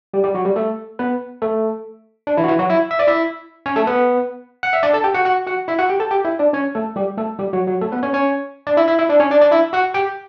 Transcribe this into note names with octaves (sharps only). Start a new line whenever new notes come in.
G3 G4
G3 G4
F#3 F#4
G3 G4
A3 A4
B3 B4
A3 A4
D4
E3 E4
F#4
E3 E4
F#3 F#4
E4 E5
E5
D5
E4 E5
C#4 C#5
A3 A4
B3 B4
F#5
E5
D4 D5
A4 A5
G4 G5
F#4 F#5
F#4 F#5
F#4 F#5
E4 E5
F#4 F#5
G4 G5
A4 A5
G4 G5
E4 E5
D4 D5
C#4 C#5
A3 A4
G3 G4
A3 A4
G3 G4
F#3 F#4
F#3 F#4
A3 A4
B3 B4
C#4 C#5
C#4 C#5
D4 D5
E4 E5
E4 E5
E4 E5
D4 D5
C#4 C#5
D4 D5
D4 D5
E4 E5
F#4 F#5
G4 G5